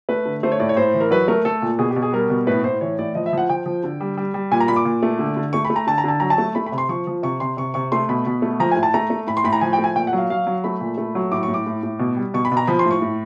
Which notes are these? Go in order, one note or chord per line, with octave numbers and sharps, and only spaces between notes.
A3 B4
D3
A3 C5
C#5
A2 D5
C#5
A2 C5
E3
A#4
F#3 B4
A3 A#4
A3 A4
A#2
B2 G#4
G4
B2
G#4
G3 A#4
B2
A2 B4
A2 C5
E3 C#5
A2 D5
F3 D#5
E5
F3 F#5
F3 G5
F3
D3
G3
G3
G3
A#2 G#5
A#5
A#2 B5
D6
A#2
A3
D3
D3
A3 C#6
B5
A3
A#5
D3 A5
A#5
D3 A5
F#3 A#5
A5
A3
A3 B5
B5
C3
C6
F3 C#6
F3
C3 C#6
C3 C6
C3 C#6
C3 C#6
A3 C6
B2 B5
B2
A3
F3 A#5
G#5
A2
A5
A3 A#5
A3
A2 B5
C6
A2 B5
A#5
F3 G#5
G5
A3
G#5
A#2 G5
F#5
F#3 F5
F#3 F5
F#3
A3 B5
A#2
A3
F#3
A2 D6
C#6
A2
D6
A2
A2
B2
G3
B2 C#6
B5
B2
A#5
F3 B5
C6
A2
C#6
A2